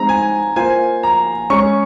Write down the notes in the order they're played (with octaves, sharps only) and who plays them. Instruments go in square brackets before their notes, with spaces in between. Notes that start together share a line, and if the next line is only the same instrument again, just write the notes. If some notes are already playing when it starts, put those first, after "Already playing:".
Already playing: [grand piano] G#3 C4 D#4 [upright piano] A#5
[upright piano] G#5
[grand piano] A#3 F4 C5 [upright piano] G#5
[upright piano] A#5
[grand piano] G#3 C#4 G#4 C#5 [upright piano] C#6